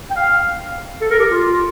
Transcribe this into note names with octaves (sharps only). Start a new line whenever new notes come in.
G5
F5
A4
A#4
G4
F4